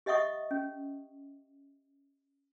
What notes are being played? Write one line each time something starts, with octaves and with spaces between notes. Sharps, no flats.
G4 D#5 E5 F#5 C#6 D#6
C#4